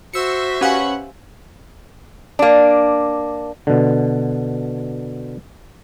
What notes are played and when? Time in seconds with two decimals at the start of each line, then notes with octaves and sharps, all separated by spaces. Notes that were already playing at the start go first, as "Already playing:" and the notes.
0.14 F#4 C5 E5 E6 C#7
0.61 C#4 G4 B4 F5 F#5 G#5
2.39 A#3 D4
3.67 B2 D3